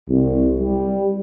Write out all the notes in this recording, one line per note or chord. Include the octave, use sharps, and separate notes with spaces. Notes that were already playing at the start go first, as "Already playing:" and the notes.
C2
G3